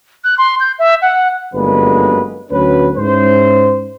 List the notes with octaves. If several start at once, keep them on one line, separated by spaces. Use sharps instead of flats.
F#6
C6
G6
E5
F#5
G1 F#2 D3 G#3 A#3 B4
D2 F#3 C#4 B4
G#2 C#4 E4 C5